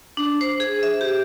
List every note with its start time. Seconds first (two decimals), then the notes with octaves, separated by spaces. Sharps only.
0.17 D4
0.41 C5
0.60 G#4
0.83 E5
1.01 G4